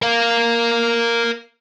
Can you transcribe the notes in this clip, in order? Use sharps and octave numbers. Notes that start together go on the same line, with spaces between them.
A#4 F5